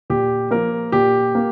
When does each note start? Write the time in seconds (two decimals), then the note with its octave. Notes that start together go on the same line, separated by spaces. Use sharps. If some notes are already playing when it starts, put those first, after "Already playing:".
0.10 A#2 G4
0.51 F3 A#3 A#4
0.92 A#2 G4
1.35 A#3